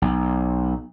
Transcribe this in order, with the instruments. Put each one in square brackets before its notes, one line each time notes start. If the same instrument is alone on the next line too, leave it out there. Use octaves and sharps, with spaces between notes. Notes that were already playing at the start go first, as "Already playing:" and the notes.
[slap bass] B1